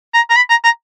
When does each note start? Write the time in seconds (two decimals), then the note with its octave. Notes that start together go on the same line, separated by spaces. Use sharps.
0.14 A#5
0.30 A#5
0.36 B5
0.50 A#5
0.64 A#5